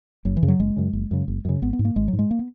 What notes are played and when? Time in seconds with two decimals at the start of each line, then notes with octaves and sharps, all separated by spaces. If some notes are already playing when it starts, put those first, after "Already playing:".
0.25 F#1 F#3
0.37 E3
0.42 F#2 C#3
0.48 F#3
0.59 F#1 G#3
0.76 F#2 C#3
0.93 F#1
1.11 F#2 C#3
1.28 F#1
1.45 F#2 C#3
1.62 G#1 B3
1.73 B3
1.79 G#2
1.85 A#3
1.96 G#1 G#3
2.08 F#3
2.13 G#2
2.19 G#3
2.31 A#3
2.39 B3